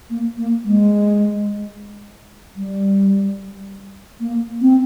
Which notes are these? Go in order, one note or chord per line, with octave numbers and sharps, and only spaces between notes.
A#3
A#3
G#3
G3
A#3
C4